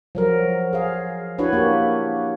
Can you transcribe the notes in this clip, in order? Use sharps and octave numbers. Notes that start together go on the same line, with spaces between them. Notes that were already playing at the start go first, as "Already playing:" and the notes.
F3 F#3 A#4
G#4 F5
D4 E4 F#4 B4 C#5
A#3 G4